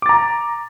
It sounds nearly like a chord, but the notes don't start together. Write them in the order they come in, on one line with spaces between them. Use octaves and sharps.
D6 A6 A#5